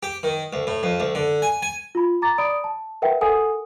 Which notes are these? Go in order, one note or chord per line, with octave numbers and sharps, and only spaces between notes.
G4
D#3
D2
A2
F2
D2
D3
G#5
G#5
F4 B5
A#5 D6 A6
D5 B5 D#6 D7
A5
A#4 B4 E5 F#5 G5
A4 A#4 F#5 G#5 D#6